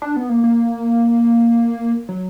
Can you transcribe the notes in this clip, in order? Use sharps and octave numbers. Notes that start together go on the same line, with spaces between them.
D4
B3
A#3
A#3
F#3